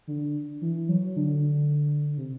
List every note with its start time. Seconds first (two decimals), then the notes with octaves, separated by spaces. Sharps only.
0.07 D3
0.62 E3
0.89 F#3
1.16 D3
2.18 C3